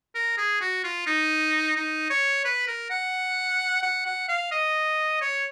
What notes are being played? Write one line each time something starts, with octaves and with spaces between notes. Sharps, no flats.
A#4
G#4
F#4
F4
D#4
D#4
C#5
B4
A#4
F#5
F#5
F#5
F5
D#5
C#5